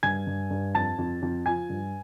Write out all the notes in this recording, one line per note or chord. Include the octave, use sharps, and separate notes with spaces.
G2 G#5 G#6
G2
G2
F2 A5 A6
F2
F2
F3 G#5 G#6
G2